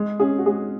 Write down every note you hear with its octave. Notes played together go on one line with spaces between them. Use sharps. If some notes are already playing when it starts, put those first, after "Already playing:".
Already playing: G#3
C#4 G#4
F#4
G#3 G#4